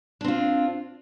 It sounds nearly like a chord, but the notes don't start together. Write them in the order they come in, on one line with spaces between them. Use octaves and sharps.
D4 C4 F4